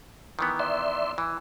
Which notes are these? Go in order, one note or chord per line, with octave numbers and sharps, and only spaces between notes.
D#3 E3 B3
D5 E5 C6
E3